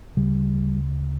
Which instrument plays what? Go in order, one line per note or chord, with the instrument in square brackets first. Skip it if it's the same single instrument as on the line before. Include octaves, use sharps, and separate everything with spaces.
[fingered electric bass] D2 C#3 G3